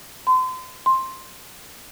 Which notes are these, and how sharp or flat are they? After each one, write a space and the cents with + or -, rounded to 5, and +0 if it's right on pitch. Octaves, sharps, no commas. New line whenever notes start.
C6 -35
C6 +5